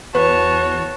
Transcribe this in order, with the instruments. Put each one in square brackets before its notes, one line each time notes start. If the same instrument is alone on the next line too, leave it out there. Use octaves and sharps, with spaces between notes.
[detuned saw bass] E2 [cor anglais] F#4 [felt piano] B4 [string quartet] C#5 A5